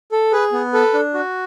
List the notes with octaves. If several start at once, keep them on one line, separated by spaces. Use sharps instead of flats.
A4
G#4 B4
B3
A4 B4
D4
F#4